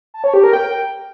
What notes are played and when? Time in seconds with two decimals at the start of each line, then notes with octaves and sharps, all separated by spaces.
0.14 A5
0.24 C#5
0.34 G4
0.43 A#4
0.53 G5